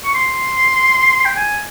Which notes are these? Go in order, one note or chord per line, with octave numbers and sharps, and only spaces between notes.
C#6
C6
G5
G#5